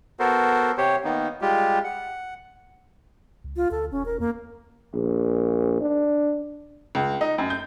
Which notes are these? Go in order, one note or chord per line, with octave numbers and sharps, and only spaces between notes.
B3 F#4 A4 A#4 C5
C3 G4 C5 C#5
D#3 A#3 B3 D#4
G3 G#3 F4 G4
F#5
C#2
F4
D2 A4
E1 C#4
A#4
E2 A#3
A#1
D4
C#2
D#4
F#2
G6